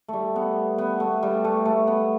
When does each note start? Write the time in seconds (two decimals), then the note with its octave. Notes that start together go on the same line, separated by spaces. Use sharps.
0.08 G3 A3
0.36 B3
0.78 B3
1.00 A3
1.22 G3
1.44 A3
1.65 A3
1.87 B3